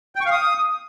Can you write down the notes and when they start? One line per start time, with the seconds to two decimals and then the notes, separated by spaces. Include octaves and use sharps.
0.16 G5
0.21 C#6
0.26 F5
0.31 D#6